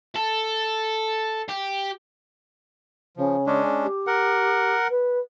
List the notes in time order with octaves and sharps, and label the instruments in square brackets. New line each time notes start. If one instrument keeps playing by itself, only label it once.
[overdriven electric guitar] A4
G4
[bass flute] C#3 [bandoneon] F3
[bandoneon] G#3 C#4 D4
[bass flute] G4
[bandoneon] A#4 F#5
[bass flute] B4